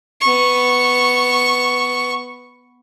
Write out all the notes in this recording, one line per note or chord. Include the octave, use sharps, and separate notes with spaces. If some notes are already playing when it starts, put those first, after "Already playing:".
B3 C#6